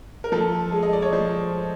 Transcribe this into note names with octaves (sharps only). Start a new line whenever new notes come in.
A#4
F3 A4
G#3
D#5
D5
C#5
F3 C5